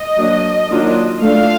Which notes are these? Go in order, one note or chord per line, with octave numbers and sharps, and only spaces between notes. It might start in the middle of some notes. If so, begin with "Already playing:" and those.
Already playing: D#5
F#3 A#3 D4
D#3 F#3 A#3 D4 F4
A3 D4 F4 F5